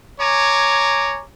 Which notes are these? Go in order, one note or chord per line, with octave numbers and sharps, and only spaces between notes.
C#5 G#5 A#5 D6